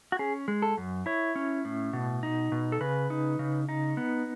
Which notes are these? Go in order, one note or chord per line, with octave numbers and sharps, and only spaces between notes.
F#4
C#4 G#4
G#3
A4
F#2
E4 C#5
C#4
A2
B2
D#4
B2
A4
C#3 B4
D#4
C#3
D#4
B3